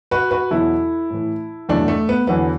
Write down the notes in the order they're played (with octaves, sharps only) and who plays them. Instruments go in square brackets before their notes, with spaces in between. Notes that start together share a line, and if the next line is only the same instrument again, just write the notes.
[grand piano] F#4 B4
F#4 B4
E2 B2 F#3 E4 A4
A2 E3
E2 B2 F#3 A3 D4
A3
B3
E2 D3 F#3 B3